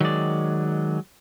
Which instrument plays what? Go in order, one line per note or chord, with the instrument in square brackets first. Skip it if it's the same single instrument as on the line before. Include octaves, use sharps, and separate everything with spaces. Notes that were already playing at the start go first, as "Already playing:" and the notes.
[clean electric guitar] D#3 D5 [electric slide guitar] F#3 G#3